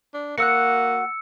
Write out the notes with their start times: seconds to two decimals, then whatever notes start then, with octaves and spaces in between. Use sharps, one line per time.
0.14 D4
0.38 A#3 F#4 F#5 E6 F#6 C#7